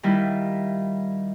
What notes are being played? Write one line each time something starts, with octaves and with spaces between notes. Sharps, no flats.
D#3 G3 E4 F4